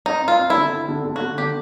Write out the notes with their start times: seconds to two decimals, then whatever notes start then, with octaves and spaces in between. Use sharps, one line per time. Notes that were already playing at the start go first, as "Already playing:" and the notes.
0.06 C4 D#4
0.22 C4
0.28 F4
0.39 C4
0.50 E4
0.55 D3
0.72 C4
0.88 D3
1.05 D3
1.16 F#4
1.22 D3
1.38 D3 G4